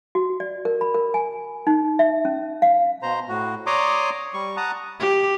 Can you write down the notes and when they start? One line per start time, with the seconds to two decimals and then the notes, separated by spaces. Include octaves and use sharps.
0.15 F#4
0.40 D5
0.65 A#4
0.81 B5
0.94 A#4
1.14 G#5
1.67 D#4
1.99 E5
2.25 C#4
2.62 F5
3.02 B2 C5 A#5
3.29 A2 F#4
3.66 C#5 D5 A#5 C6 D6 D#6
4.34 G3 C#6
4.57 F#5 A5 A#5 D#6
4.99 G4